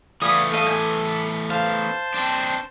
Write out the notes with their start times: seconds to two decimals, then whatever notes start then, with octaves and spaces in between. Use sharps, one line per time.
0.22 E3 A3 B3 D5 F5 G#5 D#6
0.52 A4 D#5 F5
0.67 G#5
1.50 C5 F5 A5
2.14 C4 D4